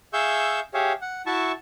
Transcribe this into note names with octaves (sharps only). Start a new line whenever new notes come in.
G#4 E5 F5 C#6 E6 G6
G4 G#4 C#5 E5 F5
F#5
E4 F#4 E5 A5 C#6